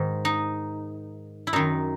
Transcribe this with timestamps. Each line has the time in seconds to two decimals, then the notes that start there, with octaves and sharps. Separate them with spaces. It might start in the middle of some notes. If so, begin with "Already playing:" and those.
Already playing: G#2 D#3
0.25 D#4
1.47 E4
1.53 F#2 D#3 D#4